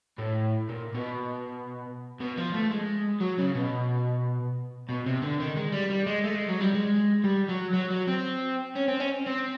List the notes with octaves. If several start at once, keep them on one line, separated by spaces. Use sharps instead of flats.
A2
A#2
B2
B2
F3
A3
G#3
F#3
C#3
B2
B2
C3
D3
D#3
G#3
G3
G3
G#3
A3
G#3
F#3
G3
G#3
G3
F#3
F#3
F#3
C4
C#4
C4
C#4
C4